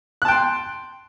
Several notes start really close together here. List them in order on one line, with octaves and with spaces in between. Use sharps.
F#6 A5 G5 C6